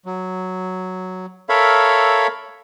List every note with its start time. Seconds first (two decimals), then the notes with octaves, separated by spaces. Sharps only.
0.06 F#3
1.49 A4 A#4 C#5 E5 F5 B5